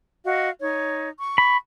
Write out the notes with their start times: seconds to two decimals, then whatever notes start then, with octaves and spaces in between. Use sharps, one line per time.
0.25 F#4 D#5 F5
0.61 D#4 C#5
1.21 C#6
1.38 B5